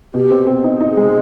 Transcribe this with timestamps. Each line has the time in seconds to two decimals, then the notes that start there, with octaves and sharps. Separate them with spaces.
0.14 B2 G4
0.31 C4
0.47 C4
0.64 D#4
0.81 D#4
0.89 G#4
0.97 G#3